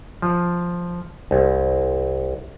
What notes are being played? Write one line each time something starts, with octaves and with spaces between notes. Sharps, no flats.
F3
C2